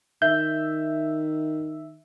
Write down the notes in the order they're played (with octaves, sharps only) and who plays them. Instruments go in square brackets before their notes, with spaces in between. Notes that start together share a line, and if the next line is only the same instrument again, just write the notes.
[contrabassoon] D#3 [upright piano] E5 [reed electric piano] G6